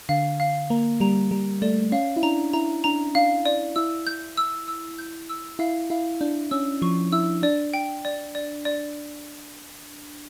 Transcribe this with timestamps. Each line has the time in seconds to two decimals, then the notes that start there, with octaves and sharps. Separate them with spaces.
0.09 D3 F5
0.40 F5
0.70 A#3 A#5
1.00 G3 A#5
1.31 G3 A#5
1.62 A3 D5
1.92 C#4 F5
2.16 E4
2.23 D4 A#5
2.53 E4 A#5
2.84 D4 A#5
3.15 D4 F5
3.46 D5
3.76 E4 E6
4.07 G6
4.37 E6
4.68 E6
4.99 G6
5.29 E6
5.59 E4 F5
5.90 E4 F5
6.21 D4 G6
6.51 C#4 E6
6.82 F3 C#6
7.12 E4 E6
7.43 D4 D5
7.74 G5
8.05 D5
8.35 D5
8.65 D5